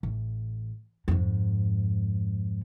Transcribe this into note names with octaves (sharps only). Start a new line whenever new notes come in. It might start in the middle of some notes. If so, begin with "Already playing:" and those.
A1
F2 G#2